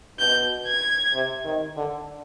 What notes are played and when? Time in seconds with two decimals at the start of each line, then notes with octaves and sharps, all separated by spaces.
0.19 B2 G6
0.66 G#6
1.14 C3
1.45 D#3
1.77 D3